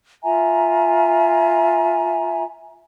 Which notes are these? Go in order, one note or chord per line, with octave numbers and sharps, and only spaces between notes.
F4 E5 G#5 A#5